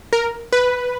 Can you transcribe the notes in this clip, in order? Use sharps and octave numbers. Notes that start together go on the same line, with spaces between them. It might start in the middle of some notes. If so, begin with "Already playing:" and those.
A#4
B4